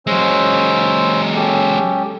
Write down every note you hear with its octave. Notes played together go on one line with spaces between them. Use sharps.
F#3 G#3 C#4 C5 E6
C#4 G4 A4